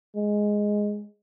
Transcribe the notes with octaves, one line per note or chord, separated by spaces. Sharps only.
G#3